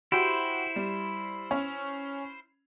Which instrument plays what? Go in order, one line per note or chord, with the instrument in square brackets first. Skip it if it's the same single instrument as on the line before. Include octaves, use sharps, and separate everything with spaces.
[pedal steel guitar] E4 C5 [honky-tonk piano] F#4 G4
[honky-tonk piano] G3
C#4